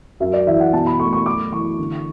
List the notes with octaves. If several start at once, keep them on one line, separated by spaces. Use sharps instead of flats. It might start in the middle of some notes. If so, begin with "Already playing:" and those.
F#2 E5
D5
E3 E5
F#5
B2 A5
B5
A3 C#6
C#6
F#2 D6
E3 C#6
D3